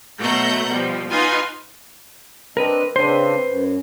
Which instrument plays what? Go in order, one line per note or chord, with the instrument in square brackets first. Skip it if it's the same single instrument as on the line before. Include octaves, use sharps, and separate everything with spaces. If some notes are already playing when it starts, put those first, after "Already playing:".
[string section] B2 F#3 A3 F#5 A#5 G6
B2 F3 G3
D#4 F4 B4 F#5 G#5 C6
[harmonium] C4 D4 D#5 [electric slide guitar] A#4 B4
[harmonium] C#3 C4 D4 [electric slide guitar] B4 C5
[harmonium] F#2